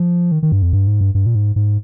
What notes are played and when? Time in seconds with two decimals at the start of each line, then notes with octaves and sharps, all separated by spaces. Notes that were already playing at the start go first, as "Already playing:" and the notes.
Already playing: F3
0.32 D#3
0.43 D#3
0.52 G2
0.62 F2
0.73 G2
0.87 G#2
1.01 G2
1.15 G2
1.26 A#2
1.35 G#2
1.56 G#2